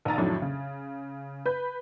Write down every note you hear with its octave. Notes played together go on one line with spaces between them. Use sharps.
A#1 D#3 A#5 A6
F2 A2 D#3 F#3 D4
C#3
B4 G6